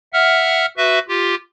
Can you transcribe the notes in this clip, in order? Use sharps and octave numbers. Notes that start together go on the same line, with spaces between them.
E5 F#5 F6
F#4 B4 E5
F4 G4